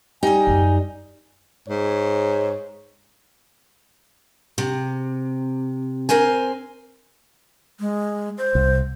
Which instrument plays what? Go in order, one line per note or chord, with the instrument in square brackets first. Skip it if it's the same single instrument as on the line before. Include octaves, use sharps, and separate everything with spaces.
[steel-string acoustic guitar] G3 D#4 [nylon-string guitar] G4 [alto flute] G#5
[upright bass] F#2
[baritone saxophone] G#2 [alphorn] C#5
[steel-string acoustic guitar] C3
C4 A#4 C5 G#5
[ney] G#3
C5
[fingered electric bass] C2